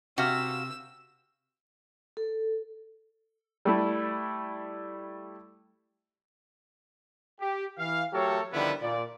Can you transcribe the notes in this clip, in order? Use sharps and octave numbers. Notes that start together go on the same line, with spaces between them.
C3 F#4 F5 E6
A4
G3 A3 E4
G4
E3 F5
F#3 A3 G4 A4 A#4 C#5
D3 D#3 F3 G3 B3 E4
A#2 D5